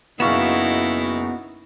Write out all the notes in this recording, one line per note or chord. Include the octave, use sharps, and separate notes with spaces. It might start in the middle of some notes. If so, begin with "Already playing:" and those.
F#1 B3 D#4 E4 F#4 F5 C#6 E7